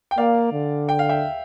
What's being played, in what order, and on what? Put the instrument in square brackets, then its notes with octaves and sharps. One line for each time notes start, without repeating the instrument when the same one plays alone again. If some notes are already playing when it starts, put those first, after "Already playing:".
[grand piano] G5
[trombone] A#3 [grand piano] D5 F5
[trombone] D3
[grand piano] G5
F5
E5 G5